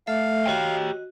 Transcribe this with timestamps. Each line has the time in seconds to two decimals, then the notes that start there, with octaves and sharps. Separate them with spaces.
0.07 A3 A4 E5 F5
0.46 F#4 G4 C#5 D#5 G5